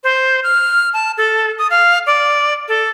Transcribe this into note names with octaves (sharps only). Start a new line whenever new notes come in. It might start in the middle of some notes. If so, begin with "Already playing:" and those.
C5
F6
A5
A4
D#6
F5
D5
A4